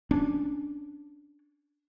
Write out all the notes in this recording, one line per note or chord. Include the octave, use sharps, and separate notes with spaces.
C#4 D4